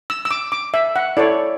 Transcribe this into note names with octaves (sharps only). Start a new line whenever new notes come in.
E6
E6
D6
D6
E5
F#5
E4 A4 C#5 D5